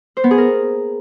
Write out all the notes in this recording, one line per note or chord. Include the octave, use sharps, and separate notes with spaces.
C5
B3
G#4
A#4